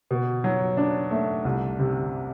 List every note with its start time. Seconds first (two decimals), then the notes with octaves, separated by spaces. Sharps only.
0.11 B2
0.44 F#3
0.77 D4
1.11 A3
1.45 C2
1.79 C3